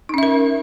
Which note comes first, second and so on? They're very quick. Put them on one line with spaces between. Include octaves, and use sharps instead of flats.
D#4 C#4 E5 A#4